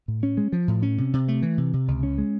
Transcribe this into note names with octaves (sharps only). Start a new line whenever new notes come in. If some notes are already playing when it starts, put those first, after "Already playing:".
A2
C#4
G#3
F3
A2
C#4
C3
C3
A3
E3
C3
C3
C#2
C#4
G#3